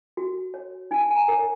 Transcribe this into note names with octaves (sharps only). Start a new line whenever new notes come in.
F#4
C#5
D#4 G#5
G#5
A#5
A#4 C#5